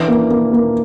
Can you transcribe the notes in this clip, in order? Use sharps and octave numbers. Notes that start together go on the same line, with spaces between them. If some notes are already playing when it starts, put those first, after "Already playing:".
Already playing: E3 D4
A#3
A#3
A#3